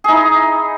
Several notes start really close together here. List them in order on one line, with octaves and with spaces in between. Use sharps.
G#4 D#4 E4